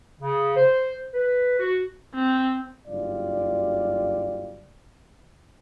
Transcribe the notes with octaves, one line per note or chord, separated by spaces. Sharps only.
C#3
C5
B4
F#4
C4
F#1 G2 F4 G4 D5